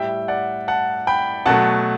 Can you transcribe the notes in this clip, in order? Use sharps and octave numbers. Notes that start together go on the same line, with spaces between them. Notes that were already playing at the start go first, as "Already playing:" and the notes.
Already playing: A2 G3 E5 G5
D5 F#5
F#5 A5
G5 B5
B2 F#3 A3 F#5 A5